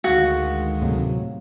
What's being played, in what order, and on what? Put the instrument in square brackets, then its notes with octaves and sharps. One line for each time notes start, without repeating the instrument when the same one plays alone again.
[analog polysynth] D2 D#3 G#3 [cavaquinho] F#4 [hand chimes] F5
[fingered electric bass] A2 C3 F#3